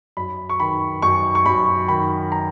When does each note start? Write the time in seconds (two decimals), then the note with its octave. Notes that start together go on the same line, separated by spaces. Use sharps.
0.17 F#2 B5
0.50 C#6
0.60 D#3 B5
1.02 F#2 C#6
1.35 C#6
1.45 F#2 B5
1.88 D#3 B5
2.32 A#5